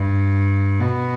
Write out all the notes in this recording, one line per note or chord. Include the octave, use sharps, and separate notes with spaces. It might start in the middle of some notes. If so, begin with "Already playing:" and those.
Already playing: G2
B2